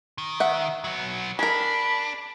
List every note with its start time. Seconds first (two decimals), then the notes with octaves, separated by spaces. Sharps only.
0.18 D#3
0.40 E5 F#5
0.84 F#3 B3
1.39 D4 G#4 A#4 B5